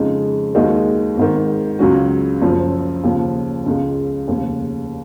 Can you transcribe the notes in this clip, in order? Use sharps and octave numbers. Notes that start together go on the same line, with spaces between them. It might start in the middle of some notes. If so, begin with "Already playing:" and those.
Already playing: F2 C#3 G#3 D#4
D#2 D#3 G#3 D#4 F#4
G#1 G#2 D#3
C#2 C#3 F#3 C#4 F#4
F#1 F#2 F3
D#2 C#3 F3
C#2 C#3 G#3
F1 D#2 C#3